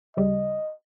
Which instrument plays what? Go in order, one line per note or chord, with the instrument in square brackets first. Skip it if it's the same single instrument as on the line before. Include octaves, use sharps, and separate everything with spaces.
[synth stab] D2 C#3 G3 [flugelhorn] D#5